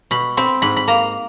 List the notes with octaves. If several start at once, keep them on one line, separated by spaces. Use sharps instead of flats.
B2 B5
C4 B5
G#2 B5
B5
A#3 A#5